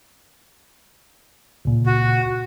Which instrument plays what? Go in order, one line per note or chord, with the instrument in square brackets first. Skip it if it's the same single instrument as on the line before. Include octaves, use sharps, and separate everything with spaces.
[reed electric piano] C#2 A#2
[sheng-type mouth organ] F#4